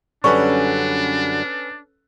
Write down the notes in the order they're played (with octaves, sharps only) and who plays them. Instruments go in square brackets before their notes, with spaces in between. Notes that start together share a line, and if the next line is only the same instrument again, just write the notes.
[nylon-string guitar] F#2 D3 G3 [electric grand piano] C#4 A4 B4 [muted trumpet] D4 [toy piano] C#6